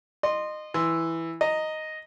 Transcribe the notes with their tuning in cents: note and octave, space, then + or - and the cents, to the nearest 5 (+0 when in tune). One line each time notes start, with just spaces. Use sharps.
D#5 -25 C6 +0
E3 +0 C6 -15
D#5 +0 A#5 -10